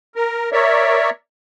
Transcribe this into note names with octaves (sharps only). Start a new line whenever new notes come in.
A#4
A#4 C#5 D5 E5